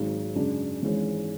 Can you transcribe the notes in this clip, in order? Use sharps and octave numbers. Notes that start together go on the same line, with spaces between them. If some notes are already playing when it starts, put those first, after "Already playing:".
Already playing: G#1 G#2 F#3
F#2 C#3 G#3 D4
G#1 G#2 E3 G#3 C#4